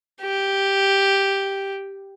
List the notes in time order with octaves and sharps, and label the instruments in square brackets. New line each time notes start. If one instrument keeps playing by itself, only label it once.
[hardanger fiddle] G4